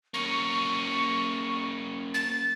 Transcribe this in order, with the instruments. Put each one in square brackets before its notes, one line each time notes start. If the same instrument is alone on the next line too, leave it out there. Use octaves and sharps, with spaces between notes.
[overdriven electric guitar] A#3 C#4 [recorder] C#6
[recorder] A6